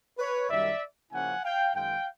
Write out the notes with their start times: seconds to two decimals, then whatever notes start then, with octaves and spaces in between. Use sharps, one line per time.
0.18 B4 C#5
0.49 F#2 D#3 G3 D5 E5
1.11 C#3 F3 A#3 C#4 E4 F#5 G#5
1.43 F5 G5
1.74 F#2 D#3 G#3 F5 G5